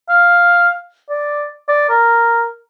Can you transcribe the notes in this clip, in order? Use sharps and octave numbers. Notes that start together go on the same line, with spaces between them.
F5
D5
D5
A#4